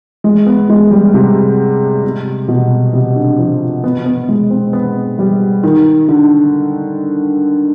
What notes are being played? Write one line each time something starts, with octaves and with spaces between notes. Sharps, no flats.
G#3
B3
G#3
G3
C3
C3
B2
C3
D3
F3
B3
B3
G#3
C4
B3
G3
D#3
D3